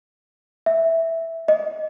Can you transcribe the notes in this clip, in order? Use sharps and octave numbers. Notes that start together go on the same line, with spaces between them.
E5
D#5